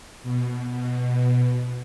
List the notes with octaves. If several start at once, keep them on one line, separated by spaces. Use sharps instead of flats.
B2
B2